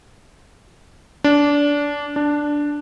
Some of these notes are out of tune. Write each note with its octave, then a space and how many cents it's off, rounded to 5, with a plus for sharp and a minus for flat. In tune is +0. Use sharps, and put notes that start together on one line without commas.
D4 -20
D4 +0